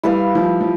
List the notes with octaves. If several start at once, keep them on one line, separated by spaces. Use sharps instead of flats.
G3 E4 B4 F5
F3
F3